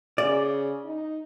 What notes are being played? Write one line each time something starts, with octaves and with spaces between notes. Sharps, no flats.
C#3 D5
D#4